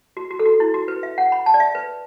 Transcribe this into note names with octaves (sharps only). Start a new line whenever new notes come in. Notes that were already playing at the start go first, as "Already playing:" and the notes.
F#4
F#4
A4
F#4
E4
F#4
B4
E5
F#5
B5
A5
D5
E5
B4